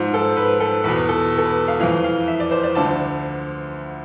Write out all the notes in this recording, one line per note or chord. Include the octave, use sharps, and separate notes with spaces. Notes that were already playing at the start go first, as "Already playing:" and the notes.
Already playing: G#2 F3
A4
B4
A4
E2 B2 B4
A4
A4
B4
F5
F2 E3 F5
F5
E5
D5
C5
D5
D2 D3 F3 A5